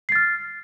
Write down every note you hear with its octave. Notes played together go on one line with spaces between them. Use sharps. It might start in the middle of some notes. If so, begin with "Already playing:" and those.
F6 A6 C7